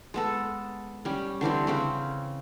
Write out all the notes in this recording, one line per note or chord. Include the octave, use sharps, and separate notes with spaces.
G#3 B3 A4
G3 C#4
D3 E3 G3 C4
C#3 C4 C#4